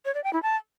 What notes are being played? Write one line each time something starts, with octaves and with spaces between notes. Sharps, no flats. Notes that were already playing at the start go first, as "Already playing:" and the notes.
C#5
D5
G5
E4
A5